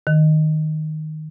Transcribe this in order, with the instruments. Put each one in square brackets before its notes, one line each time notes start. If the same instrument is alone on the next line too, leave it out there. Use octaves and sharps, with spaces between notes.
[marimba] D#3